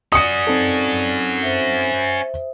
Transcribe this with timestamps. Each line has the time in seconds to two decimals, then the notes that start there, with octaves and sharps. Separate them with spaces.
0.12 C#4 F#4 D5 D#6 C#7
0.47 C4 D#4 A4
1.42 C5 E5